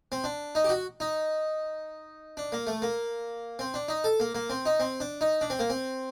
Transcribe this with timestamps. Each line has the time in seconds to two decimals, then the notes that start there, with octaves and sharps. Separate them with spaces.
0.12 C4
0.24 D4
0.55 D#4
0.64 G4
0.69 F#4
1.00 D#4
2.37 D4
2.52 A#3
2.67 A3
2.82 A#3
3.59 C4
3.74 D4
3.88 D#4
4.04 A4
4.20 A#3
4.35 A#3
4.50 C4
4.66 D#4
4.80 C4
5.00 D4
5.21 D#4
5.41 D4
5.50 C4
5.59 A#3
5.70 C4